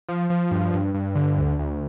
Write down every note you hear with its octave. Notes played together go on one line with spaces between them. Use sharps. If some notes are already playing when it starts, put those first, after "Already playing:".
F3
F3
G2
G2
G2
D3
D2
D2